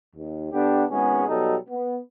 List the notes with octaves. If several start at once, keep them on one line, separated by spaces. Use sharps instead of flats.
D#2
D3 B3 D4 G4
G#1 G#3 B3 C#4 G#4
B2 F#3 G3 D#4 A4
B3